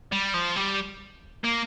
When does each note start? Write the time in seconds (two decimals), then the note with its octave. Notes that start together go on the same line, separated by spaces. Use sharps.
0.12 G3
0.34 F3
0.56 G3
1.44 A#3